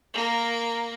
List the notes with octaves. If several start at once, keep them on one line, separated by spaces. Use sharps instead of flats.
A#3 A#4